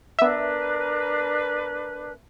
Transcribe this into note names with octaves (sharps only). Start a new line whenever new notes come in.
B3 D4 A#4 B4 E5